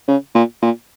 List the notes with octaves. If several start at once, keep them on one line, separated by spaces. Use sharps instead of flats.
C#3
A#2
A#2